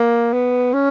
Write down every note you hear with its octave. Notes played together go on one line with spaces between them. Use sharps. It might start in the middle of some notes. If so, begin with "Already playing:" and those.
Already playing: A#3
B3
C#4